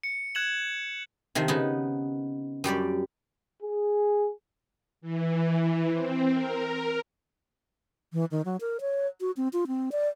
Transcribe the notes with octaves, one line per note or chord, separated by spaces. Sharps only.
C#7
F#6 G#6 E7 F#7
C3 D#3 F3
C#3 B3 D#4
F#2 G3 G4 D5
G#4
E3
C4
A#4
E3
D#3
F#3
A#4
C#5
F#4
C4
F4
C4
D5